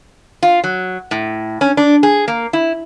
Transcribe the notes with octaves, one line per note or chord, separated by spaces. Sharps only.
F4
F#3
A2
C#4
D4
G#4
A#3
E4